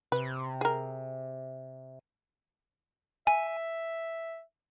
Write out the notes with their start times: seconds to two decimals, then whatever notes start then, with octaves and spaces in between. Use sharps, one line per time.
0.12 C3 B4
0.61 G#4 A#4
3.27 E5 G#5